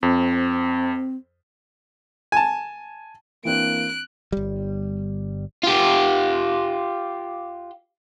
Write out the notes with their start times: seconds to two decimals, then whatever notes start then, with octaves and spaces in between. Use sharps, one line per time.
0.03 F2 C4
2.32 G#5 A5
3.45 E3 A#3 C4 D4 F#6 D7
4.32 G1 G3
5.63 F4 G4